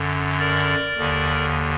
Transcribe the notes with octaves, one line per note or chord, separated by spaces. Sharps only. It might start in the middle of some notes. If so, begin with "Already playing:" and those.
Already playing: F#2 D3
A#4 D5
D#2 D3